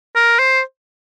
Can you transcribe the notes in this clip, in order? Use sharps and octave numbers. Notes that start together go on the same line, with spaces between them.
A#4
C5